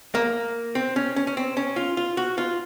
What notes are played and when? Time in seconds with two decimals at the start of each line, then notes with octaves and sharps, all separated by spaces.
0.15 A#3
0.75 C4
0.96 C#4
1.16 C#4
1.27 C#4
1.37 C4
1.57 C#4
1.76 F4
1.97 F4
2.17 F#4
2.38 F4